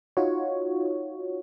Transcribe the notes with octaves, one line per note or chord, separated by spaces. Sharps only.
D#4 F4 F#4 C#5